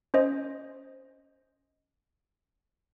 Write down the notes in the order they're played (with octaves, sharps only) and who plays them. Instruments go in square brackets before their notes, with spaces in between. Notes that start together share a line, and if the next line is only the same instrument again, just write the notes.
[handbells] C#4 C5 D#5